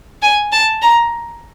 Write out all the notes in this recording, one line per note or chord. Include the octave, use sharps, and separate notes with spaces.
G#5
A5
A#5